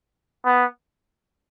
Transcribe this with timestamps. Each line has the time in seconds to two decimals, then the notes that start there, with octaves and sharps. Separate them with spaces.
0.45 B3